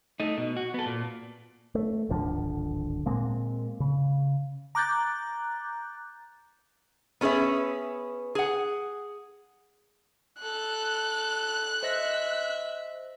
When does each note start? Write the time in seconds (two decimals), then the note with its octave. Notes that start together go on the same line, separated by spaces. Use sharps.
0.20 A3 D#4
0.38 B2
0.57 F#4
0.74 B3 A4
0.86 A#2
1.75 A3
2.09 D1 G#1 D3 F3
3.06 A#2 G#3 A#3 C4
3.80 C#3
4.75 A#5 D6 F#6 G6 A6
7.21 B3 C#4 G#4 B4 E5
8.35 G#4 F#5
10.42 A4 F#6
11.83 C5 D#5 E5 A#6